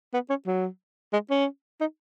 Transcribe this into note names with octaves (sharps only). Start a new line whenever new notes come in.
B3
C#4
F#3
G#3
C#4
D#4